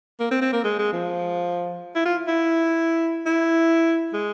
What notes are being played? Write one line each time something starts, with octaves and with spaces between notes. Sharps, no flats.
A#3
C4
C4
A#3
G#3
G#3
F3
E4
F4
E4
E4
G#3